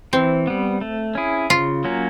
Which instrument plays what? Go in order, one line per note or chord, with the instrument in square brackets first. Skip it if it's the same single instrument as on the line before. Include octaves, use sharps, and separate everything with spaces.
[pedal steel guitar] E3 [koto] C4
[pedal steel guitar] G3 B3
A3
C#4 E4 G#4
[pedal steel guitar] C#3 [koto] F4
[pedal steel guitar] F#3 A#3 C#4